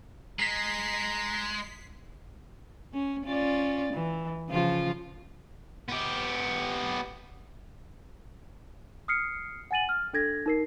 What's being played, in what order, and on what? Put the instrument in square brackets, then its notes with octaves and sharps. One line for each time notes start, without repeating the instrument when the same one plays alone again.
[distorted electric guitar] G#3 [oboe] A#5 [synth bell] B6 C7
[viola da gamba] C#4
C#4 F4 D5
E3
C#3 F3 F4
[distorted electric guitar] B3 G4
[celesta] D#6 F6 C7 C#7
F#5 G#5 A6 D#7 F#7
F6
D4 A4 G#6 A#6
D#4 A#4 C7